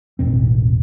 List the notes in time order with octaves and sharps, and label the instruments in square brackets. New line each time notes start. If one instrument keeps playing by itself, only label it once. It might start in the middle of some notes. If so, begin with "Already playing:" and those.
[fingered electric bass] A1 E2 B2 C4